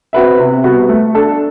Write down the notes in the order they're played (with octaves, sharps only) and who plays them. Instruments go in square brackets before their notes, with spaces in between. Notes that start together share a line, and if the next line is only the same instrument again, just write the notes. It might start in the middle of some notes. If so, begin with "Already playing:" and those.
[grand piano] C4 F#4 B4 E5
C3
G3 B3 F#4
A3
D4 A4